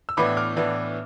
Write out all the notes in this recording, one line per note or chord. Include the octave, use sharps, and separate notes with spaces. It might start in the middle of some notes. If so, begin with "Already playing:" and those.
E6
A2 E3 B3 D4 B5 D6
D6 F6
A2 E3 B3 D4